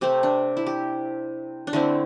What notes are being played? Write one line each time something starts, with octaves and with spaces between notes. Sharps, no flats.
C3 A3 C4 G4
D4
E4
G4
D4
D3 A3 C4 E4